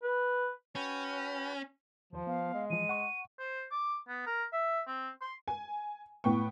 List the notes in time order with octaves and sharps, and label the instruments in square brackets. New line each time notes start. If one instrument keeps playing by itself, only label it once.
[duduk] B4
[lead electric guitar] C#4 [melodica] F#4 B4 G5
[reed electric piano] D#2 C5 [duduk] F3
[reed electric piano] B3 [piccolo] F5
[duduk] G#3
[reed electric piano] E3 F3 [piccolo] D#7
[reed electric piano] F#5 C#6
[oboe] C5
D6
B3
A#4
E5
C4
C6
[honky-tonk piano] G#5
A2 B3 G5 C#6